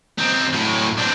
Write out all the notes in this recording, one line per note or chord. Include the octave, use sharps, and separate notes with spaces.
D#3 C4
A2 F#3
C4 D4